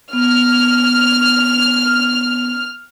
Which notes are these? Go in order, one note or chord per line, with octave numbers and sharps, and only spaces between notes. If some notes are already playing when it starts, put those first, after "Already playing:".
B3 F6